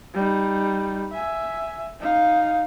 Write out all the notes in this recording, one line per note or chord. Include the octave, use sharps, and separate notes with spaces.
G3 D#4
E5 G#5
D#4 F5